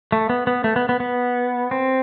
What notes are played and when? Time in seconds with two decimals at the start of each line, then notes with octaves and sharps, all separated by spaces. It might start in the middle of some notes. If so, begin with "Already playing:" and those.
0.12 A3
0.29 B3
0.47 B3
0.64 A3
0.76 B3
0.89 B3
1.00 B3
1.71 C4